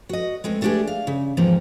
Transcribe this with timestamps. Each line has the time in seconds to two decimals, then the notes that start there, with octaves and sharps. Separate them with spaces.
0.09 F#4 D#5
0.44 G#3 A3 C4
0.61 G3 A3 B3 D4 G4 G#4
0.87 F5
1.07 C#3
1.37 E2 G#2 F3 A#3 C4